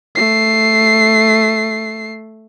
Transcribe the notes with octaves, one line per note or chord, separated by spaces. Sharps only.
A3 C7